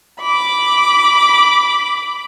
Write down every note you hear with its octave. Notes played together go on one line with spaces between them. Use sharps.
B5 D6